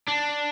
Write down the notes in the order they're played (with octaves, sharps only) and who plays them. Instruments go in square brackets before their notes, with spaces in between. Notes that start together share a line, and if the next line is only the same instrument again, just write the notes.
[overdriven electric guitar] D4